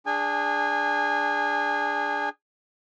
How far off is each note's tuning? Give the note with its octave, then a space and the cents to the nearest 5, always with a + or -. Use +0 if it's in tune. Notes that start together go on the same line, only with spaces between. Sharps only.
D4 +0 G#4 -10 G#5 -25